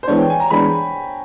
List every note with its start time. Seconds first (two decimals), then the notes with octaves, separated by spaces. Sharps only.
0.03 C5
0.08 E3 G#3 B3 D4 C#5
0.18 G5
0.30 G#5
0.40 A#5
0.50 E3 G#3 B3 D4 B5